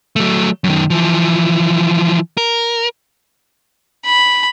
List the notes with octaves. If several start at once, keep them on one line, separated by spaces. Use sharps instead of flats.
F#3 A3
F#2 D#3
E3 F3
A#4
B5